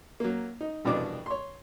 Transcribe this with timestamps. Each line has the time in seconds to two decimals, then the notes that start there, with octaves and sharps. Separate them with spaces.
0.20 F#3 A#3
0.61 D#4
0.85 C2 F2 B2 E3 D4 D6
1.26 C#5 C6